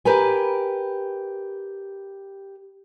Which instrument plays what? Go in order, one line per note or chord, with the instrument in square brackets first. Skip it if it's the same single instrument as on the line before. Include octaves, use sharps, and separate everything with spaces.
[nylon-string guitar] G4 A#4 B4 G#5